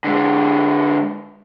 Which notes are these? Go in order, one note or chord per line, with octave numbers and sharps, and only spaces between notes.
D3 G#3